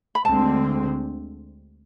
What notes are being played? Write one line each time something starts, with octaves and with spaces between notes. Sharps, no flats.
B5
D2 D3 G#3 C4 A5